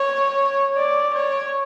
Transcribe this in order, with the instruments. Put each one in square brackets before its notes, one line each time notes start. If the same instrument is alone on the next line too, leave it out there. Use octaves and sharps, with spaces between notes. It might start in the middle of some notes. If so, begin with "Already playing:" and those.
Already playing: [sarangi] C#5
D5
C#5